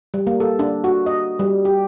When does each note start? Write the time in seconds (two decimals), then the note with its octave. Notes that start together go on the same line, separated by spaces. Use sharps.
0.14 G3
0.27 A#3
0.40 A4
0.59 D4
0.84 F#4
1.06 D#5
1.39 G3
1.65 G4